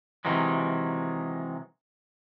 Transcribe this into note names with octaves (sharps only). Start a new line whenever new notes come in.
C3 D#3 E3 F#3 G#3